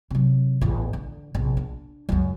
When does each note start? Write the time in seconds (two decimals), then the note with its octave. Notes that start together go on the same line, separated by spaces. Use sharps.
0.11 C3 F#3
0.61 A1 E2
0.93 D3
1.35 A#1 C3
1.57 D4
2.09 C#2 F#2